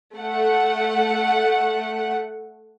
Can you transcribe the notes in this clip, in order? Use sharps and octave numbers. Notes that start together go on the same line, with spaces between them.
A3 F#5